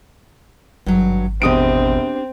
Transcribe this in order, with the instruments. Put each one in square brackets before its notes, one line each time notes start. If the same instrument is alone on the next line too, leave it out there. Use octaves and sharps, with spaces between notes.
[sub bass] G#1 [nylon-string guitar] G2 F#3
[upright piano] E1 D#6 D7 [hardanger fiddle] C4 [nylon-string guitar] D4 G4 D#5